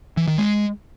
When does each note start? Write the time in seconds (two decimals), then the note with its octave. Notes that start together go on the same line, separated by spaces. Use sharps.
0.17 E3
0.28 D#3
0.38 G#3